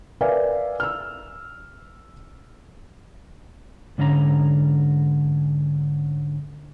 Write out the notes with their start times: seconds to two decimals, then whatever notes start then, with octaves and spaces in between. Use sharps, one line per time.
0.21 A#4 B4 D5 E5 F5 G#5
0.80 E6 F6
3.98 G#2 D3 C#4 G4 A#5